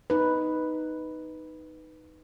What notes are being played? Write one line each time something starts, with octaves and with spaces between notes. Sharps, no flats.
D#4 B4